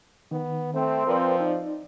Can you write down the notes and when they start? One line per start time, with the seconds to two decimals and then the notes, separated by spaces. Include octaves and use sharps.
0.31 D#3 B3
0.74 A3 C4
1.07 F3 A#4 B4 D5
1.40 D#4 D5